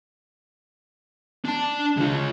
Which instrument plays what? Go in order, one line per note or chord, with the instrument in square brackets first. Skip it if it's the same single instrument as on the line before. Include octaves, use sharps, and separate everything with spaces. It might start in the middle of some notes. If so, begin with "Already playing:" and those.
[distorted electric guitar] D4 A5
C#2 F4